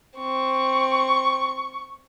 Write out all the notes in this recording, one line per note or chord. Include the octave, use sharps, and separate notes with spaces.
C4 C#6